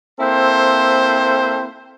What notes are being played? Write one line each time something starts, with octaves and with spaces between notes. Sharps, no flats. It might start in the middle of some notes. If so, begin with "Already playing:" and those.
A#3 C4 E4 A4 C5